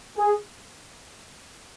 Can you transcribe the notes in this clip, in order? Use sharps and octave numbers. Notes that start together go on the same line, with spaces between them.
G#4